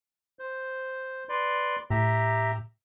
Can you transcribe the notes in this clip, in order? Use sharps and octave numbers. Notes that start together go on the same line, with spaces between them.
C5
B4 D5 C6
A2 G4 E5 A#5